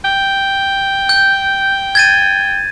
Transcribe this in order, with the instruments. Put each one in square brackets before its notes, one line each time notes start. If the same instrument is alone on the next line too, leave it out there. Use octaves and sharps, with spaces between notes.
[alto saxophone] G5
[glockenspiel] G6
G#6 A6 D#7